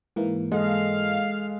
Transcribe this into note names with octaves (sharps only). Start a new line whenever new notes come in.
G#2 E3 A#3
G#3 A4 D#5 F5